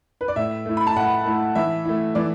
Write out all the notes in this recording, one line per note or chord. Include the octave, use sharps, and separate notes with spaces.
B4
D5
A2 E5
A3 E4
B5
A5
A2 F#5
A3 E4
E3 E5
A3 E4
E3 D5